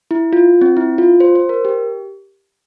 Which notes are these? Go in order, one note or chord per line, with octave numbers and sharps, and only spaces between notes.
E4
F4
C4
E4
F4
C5
C5
A#4
G4